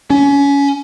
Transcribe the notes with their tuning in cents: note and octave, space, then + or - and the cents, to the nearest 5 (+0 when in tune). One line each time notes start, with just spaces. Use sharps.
C#4 +25